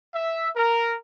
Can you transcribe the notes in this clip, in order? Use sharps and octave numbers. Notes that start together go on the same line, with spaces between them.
E5
A#4